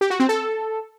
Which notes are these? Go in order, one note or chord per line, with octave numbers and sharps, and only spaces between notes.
G4
F#4
C4
A4